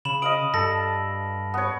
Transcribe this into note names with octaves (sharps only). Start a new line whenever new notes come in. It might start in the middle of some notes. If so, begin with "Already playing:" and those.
C#3 B5 E7 F#7
D#5 F5 D#6 D7 F#7
G2 A4 A#6
B3 C#5